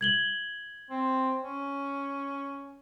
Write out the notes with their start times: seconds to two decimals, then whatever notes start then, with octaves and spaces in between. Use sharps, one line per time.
0.01 G#6 F#7 G7
0.90 C4
1.43 C#4